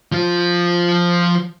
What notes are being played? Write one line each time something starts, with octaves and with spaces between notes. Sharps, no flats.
F3 F4